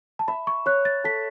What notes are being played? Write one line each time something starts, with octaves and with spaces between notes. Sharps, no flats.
A5
E5 B5
C#6
C#5 F#6
A6
A4 B6